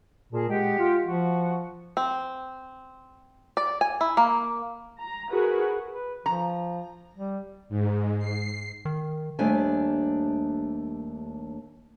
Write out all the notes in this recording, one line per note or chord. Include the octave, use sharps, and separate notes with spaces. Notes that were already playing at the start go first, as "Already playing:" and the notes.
A#2 G#4 A#4 A5
G#3 G4 F#5 G5
F4
F3 F#4
C4
D5
G#5
E4
A#3
A#5
F#4 G#4 A#4 B4
B4
F3 A#5
G3
G#2
C7
D#3
D#2 G3 A3 D4 C5 G#5